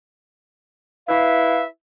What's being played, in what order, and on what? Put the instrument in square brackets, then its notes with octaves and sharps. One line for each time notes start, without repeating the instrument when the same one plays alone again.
[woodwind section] E4 B4 E5 F5